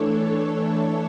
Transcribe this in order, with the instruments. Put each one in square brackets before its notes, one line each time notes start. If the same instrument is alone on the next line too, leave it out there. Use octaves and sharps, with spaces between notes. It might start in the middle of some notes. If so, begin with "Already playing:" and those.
Already playing: [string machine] E3 A3 D4 A4 C#5